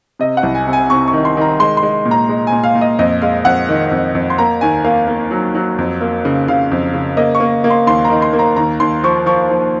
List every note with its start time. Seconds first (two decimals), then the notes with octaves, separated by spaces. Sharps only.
0.19 C3 D#5
0.37 F#5
0.43 C2
0.55 G#5
0.67 C3
0.73 G#5
0.90 C3 C#6
1.08 C#6
1.13 D#3
1.25 C6
1.37 D#3 A#5
1.60 G#3 C6
1.77 C6
1.83 G#3
2.05 A#2
2.11 A#5
2.29 G#3
2.47 G#5
2.52 A#2
2.64 F5
2.75 A#2
2.81 D#5
2.99 F2 D#5
3.22 G#3 F5
3.45 F2 F#5
3.69 D#3
3.91 F2
4.15 F2
4.30 C6
4.38 A#3 A#5
4.61 D#2 G#5
4.84 A#3 F5
5.08 A#3
5.31 F#3
5.55 F#3
5.78 F2
6.01 A#3
6.25 C#3
6.48 C#3 F5
6.72 F2
6.94 C#3
7.17 A#3 D#5
7.35 C#6
7.40 A#3
7.64 A#3
7.70 C6
7.87 D#2 C6
8.05 A#5
8.10 D#3
8.22 C6
8.33 A#3
8.39 A#5
8.56 D#2 A#5
8.80 D#2 C6
9.03 F3 C#6
9.26 F3 C#6
9.50 F3